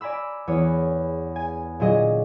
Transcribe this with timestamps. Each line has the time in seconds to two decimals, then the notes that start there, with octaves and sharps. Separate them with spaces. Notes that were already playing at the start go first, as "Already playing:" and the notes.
0.01 D5 G#5 A#5 B5 E6
0.47 E2 B3 G#4 C#5
1.36 G#5
1.80 A#2 D3 F#3 G#4 D#5